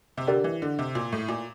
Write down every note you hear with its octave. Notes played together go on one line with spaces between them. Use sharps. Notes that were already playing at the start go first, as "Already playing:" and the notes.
C3
D3 G4 A#4 D5 G5
E3
D3
C3
A#2
A2
A#2